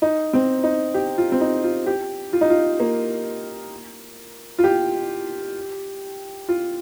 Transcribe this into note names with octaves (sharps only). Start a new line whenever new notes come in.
D#4
C4
D#4
G4
F4
C4
D#4
F4
G4
F4
D#4
F4
A#3
F4
G4
F4